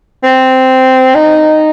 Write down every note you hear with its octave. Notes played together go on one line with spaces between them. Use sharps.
C4
D#4